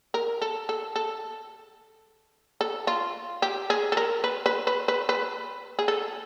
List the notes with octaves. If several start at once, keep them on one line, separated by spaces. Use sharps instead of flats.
A#4
A4
A4
A4
A4
F4
G4
G#4
A4
A#4
B4
B4
B4
B4
B4
G#4
A4